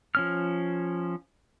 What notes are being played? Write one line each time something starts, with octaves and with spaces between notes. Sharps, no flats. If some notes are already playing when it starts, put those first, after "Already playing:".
F3 C#4 F6